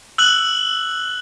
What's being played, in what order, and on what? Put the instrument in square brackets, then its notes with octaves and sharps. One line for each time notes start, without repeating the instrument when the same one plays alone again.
[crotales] E6 F#6 F#7